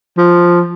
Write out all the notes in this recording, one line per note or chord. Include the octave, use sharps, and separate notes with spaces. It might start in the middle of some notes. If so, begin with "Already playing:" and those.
F3